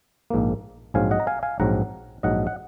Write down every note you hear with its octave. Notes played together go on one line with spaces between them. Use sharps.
A#1 G#2 F3 A#3
A#1 G#2 F#3 C4 F5 G#5
D#5 F#5
A#5
F5 G#5
F5 G#5
A#1 G#2 F#3 C4 F#5 A#5
A#1 G#2 F#3 D#5 F#5
F#5